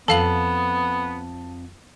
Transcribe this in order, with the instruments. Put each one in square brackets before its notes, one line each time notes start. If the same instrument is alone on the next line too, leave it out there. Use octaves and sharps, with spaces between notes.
[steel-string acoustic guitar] F2 [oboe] B3 [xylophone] A4 F5 F#7 [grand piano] A5